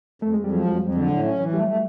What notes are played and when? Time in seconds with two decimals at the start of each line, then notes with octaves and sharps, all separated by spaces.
0.22 F2 A3
0.34 G#3
0.37 F2
0.44 G3
0.52 F3 F#3
0.66 F2
0.81 F2
0.94 D3
1.10 A2
1.24 C#4
1.39 E3
1.53 G3 A3
1.68 A3